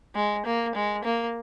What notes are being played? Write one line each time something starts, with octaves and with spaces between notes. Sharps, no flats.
G#3
A#3
G#3
A#3